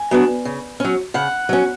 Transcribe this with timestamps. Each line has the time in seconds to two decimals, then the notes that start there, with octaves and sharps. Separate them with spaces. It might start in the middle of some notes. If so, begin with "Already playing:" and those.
Already playing: G#5
0.11 F#3 B3 D4
0.45 C#3
0.80 F#3 C#4
1.14 C#3 F#5
1.49 F#3 C#4